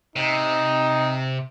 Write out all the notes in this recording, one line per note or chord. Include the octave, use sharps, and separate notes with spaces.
C3 D#4